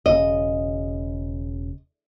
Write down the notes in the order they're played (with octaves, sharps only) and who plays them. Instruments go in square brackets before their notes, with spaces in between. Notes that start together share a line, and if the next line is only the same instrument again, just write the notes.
[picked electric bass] E1 C#3 [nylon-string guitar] D#5